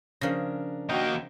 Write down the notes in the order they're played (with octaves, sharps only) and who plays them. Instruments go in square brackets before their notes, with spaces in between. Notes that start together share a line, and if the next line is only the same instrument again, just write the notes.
[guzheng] C#3 F3 [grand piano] D4 A#4 A#6
[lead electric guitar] D#2 A#3 [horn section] F#4 D#5 G5